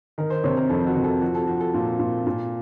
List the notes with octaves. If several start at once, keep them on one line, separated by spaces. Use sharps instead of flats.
D#3 A#4
C5
C3 C#5
A#4
F2 A4
F#4
C3
A4
F3 F#4
A4
F3 F#4
A4
A#2
A#2
A#2